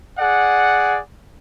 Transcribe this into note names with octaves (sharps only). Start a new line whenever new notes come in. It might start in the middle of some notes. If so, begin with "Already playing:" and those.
G#4 D5 F#5